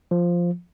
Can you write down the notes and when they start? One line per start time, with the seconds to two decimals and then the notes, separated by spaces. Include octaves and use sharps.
0.11 F3